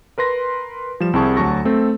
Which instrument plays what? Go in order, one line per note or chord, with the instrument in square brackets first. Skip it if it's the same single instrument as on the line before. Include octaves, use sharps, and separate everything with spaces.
[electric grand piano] A#4 B4 C6 A#6
F3 G3 E7
C2 C4 E4 G#4 A5 C#6
D2 F#3 F#4 A5 C#6 A#6
A3 C4 A4